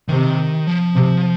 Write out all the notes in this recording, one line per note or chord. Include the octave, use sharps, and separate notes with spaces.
C3 D#3
F3
C3